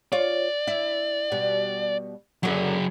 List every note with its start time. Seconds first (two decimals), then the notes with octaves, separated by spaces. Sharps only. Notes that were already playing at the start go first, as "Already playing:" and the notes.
0.12 F4 C#5 D5
0.67 E4
1.32 B2 G3
2.43 F#2 D3 F#3 G#4